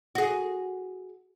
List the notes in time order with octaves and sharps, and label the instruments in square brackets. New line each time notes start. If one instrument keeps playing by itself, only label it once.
[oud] F#4 G#4